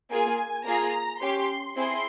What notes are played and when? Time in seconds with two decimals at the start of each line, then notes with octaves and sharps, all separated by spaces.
0.11 A#3 F4 G#4 G#5
0.66 A#3 F4 G#4 A#5
1.21 C#4 G4 C6
1.76 C4 E4 G#4 C6